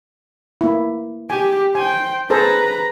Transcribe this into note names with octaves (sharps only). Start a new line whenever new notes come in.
A#3 E4
G4 G#5
C5 G5 G#5
G#4 A4 B4 C5 A#5